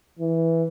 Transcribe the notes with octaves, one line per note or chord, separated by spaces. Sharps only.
E3